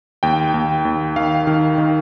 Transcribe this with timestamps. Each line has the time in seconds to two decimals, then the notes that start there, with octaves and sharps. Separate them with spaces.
0.23 D#2 G5
0.54 D#2
0.85 D#2
1.16 D#3 F5
1.47 D#3
1.78 D#3